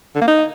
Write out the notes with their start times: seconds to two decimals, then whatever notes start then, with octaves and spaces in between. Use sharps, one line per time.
0.15 D3
0.21 A#3
0.27 D#4